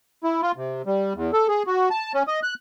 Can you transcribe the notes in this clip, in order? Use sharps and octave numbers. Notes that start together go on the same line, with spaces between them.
E4
F4
C3
G3
E2
A4
G#4
F#4
A5
C#4
D#5
F#6